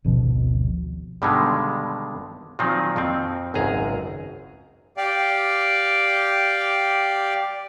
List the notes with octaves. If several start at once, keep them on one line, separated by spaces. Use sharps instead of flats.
G#1 D2 B2 F3
G2 B2 D3 D#3 G3 G#3
A#2 D#3 F3 F#3 C4 D#4
F2 F3 C4
G#1 C#2 F#2 G#4 A#5
G4 D5 F5 G5